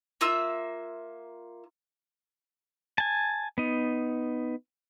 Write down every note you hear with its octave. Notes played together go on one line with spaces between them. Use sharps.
A#3 F4 E5 E6
G#5 A5
B3 D#4